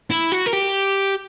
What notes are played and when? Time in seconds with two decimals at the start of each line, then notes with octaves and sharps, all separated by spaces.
0.10 E4
0.32 F#4
0.46 A#4
0.53 G4